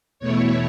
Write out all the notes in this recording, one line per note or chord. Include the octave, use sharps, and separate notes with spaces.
E2 B2 A3 E4 C#5